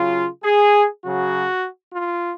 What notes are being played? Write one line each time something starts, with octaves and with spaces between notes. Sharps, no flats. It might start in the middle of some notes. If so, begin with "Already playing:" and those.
Already playing: C#3 F#3 F4
G#4
C#3 F#3 F#4
F4